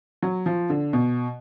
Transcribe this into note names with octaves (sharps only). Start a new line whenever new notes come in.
F#3
F3
D3
B2